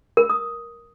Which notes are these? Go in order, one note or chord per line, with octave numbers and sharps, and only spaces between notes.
A#4
D#6